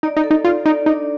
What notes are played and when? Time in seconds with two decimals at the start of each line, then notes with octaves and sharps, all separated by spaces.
0.03 D#4 D5
0.17 D#4
0.24 A4
0.31 D#4
0.44 F4 D5
0.66 D#4 D5
0.86 D4 D#4